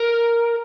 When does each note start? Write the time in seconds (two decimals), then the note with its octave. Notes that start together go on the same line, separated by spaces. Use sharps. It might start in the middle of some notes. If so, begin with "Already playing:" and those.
Already playing: A#4